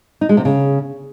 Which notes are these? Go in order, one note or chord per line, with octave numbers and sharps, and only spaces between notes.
D#4
G#3
C3
C#3